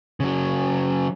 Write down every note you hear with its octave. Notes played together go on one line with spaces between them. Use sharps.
C#3 F#3